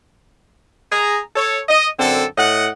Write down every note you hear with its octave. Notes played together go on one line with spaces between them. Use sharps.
G#4 A#5
A4 C#5
D#5
F#2 D3 C4 A4
A2 D#5 F#5